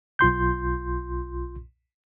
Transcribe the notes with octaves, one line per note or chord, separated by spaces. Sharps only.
B1 F4 C6 G6